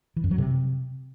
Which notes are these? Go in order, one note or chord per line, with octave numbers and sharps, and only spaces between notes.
E3
F#2
F#3
C3